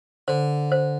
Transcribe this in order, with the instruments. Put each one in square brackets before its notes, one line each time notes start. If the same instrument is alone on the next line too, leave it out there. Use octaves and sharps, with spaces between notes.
[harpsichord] D3 [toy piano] C5
[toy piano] C5